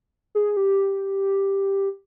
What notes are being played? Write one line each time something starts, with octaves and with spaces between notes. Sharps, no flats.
G#4
G4